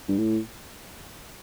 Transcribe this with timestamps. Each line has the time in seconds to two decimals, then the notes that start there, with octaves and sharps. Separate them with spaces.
0.08 G2
0.18 A2